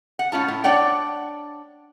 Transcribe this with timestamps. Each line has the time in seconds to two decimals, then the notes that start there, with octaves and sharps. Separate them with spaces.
0.19 F#5
0.32 A2 C#4 F4 A5
0.48 A2
0.64 D4 C#5 D5 F#5 G5